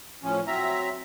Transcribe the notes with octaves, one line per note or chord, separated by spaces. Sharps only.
A2 F3 C#4
F#3 C4 E5 A#5